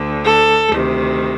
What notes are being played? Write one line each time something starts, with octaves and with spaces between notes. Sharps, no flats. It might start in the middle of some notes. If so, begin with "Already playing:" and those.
Already playing: D2 D3
A4
D2 C3 D#3